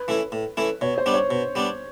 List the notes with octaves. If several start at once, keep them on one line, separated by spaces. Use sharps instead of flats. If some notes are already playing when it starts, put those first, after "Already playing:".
Already playing: B4
E3 A3 C#4 E4
A2
E3 A3 C#4 E4
B2 C#5
C5
G3 B3 D4
C#5
B2
G3 B3 D4